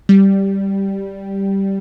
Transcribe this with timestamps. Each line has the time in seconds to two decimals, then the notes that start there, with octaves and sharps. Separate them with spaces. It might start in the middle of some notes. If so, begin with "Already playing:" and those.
0.09 G3